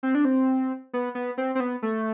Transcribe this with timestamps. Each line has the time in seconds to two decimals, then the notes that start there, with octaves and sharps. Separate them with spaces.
0.03 C4
0.15 D4
0.25 C4
0.93 B3
1.15 B3
1.38 C4
1.55 C4
1.60 B3
1.82 A3